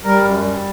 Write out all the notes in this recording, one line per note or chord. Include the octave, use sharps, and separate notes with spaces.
G3 A#4
F#2
G3